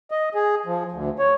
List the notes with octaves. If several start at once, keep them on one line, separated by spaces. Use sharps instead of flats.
D#5
G#4
F3
D2
C#5